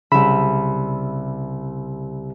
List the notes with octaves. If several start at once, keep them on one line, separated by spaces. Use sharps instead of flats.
C2 C#3 E5 B5